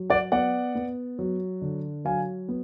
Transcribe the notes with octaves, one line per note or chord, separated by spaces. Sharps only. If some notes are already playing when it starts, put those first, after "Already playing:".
Already playing: F#3
D5 F#5
B3 D5 F#5
B3
F#3
D3
F#3 F5 G#5
B3